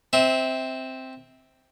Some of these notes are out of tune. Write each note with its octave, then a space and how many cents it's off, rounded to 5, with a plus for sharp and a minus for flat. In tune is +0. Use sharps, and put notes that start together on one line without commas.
C4 +0 E5 -25